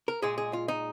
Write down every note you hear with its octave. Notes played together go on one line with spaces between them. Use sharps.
A#4
A#2 G#3 G#4
G#4
F4
D#4